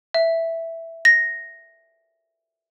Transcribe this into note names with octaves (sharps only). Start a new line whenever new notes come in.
E5
A#6